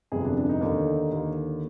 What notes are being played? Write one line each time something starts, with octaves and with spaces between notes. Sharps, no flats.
G1 F2 C3 G#4
D4
D4
D#4
D#2 D3
D#2 D3